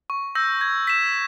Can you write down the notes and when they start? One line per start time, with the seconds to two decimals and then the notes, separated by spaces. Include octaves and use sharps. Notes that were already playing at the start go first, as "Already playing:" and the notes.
0.10 C#6
0.35 E6 G6 A#6
0.61 G#6
0.87 B6 E7